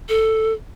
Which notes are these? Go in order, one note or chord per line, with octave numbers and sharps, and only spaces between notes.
A4